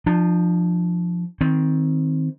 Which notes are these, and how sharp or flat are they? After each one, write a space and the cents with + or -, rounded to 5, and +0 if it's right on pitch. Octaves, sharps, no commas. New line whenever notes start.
F3 +0 D4 +40
D#3 +15 C4 +0